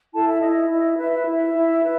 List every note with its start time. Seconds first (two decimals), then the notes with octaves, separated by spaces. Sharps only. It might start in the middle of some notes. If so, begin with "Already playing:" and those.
0.13 E4 A4 A5
0.28 E5
0.42 E4 D#5
0.55 E5
0.69 E4 D#5
0.83 E5
0.97 B4 E5
1.12 E5
1.25 E4
1.53 E4
1.82 B4